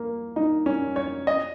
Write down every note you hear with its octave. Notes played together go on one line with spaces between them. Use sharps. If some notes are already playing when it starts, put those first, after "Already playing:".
Already playing: A#3
D#4
C#4
C#5
D#5